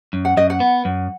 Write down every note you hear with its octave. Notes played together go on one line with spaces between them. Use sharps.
F#2
F#5
F#2 D#5
F#5
B3
F#2